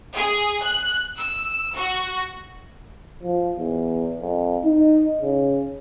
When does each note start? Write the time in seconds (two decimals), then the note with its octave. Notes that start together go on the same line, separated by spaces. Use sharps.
0.14 G#4
0.63 F#6
1.17 E6
1.75 F#4
3.23 F3
3.59 E2
4.20 F2
4.65 D#4
5.22 C#3